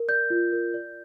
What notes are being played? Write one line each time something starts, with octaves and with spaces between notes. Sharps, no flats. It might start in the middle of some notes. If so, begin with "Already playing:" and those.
Already playing: A#4
D5 G6
F4
A#4
D5